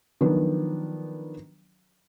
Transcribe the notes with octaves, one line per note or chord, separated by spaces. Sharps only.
D#3 F3 F#3 B3 D4